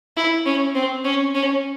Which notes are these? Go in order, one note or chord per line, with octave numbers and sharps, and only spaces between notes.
E4
C#4
C4
C#4
C#4